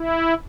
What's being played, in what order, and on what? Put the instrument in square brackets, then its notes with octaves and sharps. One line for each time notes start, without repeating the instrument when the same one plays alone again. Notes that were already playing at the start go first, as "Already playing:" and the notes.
Already playing: [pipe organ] E4